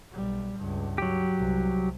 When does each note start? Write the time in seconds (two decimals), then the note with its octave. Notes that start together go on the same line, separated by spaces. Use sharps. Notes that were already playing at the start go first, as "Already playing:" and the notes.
0.12 B1 G3
0.56 C#2 G2
0.98 F#3 G4
1.37 C2